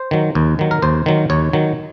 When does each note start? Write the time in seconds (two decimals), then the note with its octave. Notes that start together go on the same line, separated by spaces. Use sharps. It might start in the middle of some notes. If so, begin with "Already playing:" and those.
Already playing: C5
0.11 D#3 F#3
0.35 D#2
0.59 D#3 F#3
0.71 A#4
0.82 D#2 C5
1.06 D#3 F#3
1.30 D#2 C#5
1.53 D#3 F#3